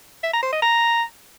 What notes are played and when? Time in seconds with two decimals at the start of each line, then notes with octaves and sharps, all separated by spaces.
0.23 E5
0.33 A#5
0.43 C5
0.52 D#5
0.62 A#5